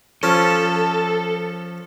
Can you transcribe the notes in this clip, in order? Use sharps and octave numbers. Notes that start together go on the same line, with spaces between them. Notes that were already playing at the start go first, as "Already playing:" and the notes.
F3 C#4 A4